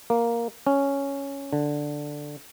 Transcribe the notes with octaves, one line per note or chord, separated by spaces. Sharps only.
A#3
C#4
D3